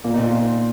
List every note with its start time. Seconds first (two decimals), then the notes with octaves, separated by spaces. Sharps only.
0.04 A#2 A#3
0.14 D#4
0.19 A#2
0.25 F4